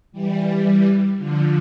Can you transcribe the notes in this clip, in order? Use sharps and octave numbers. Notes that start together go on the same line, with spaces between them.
E3 G3
D3 F3